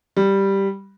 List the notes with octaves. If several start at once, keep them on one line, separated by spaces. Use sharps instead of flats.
G3